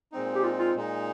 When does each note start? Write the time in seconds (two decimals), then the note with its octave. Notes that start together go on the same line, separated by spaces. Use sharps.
0.12 A#2 G#3 C4 D#4
0.35 G4
0.44 F4
0.59 F4
0.75 A#2 G#3 D#4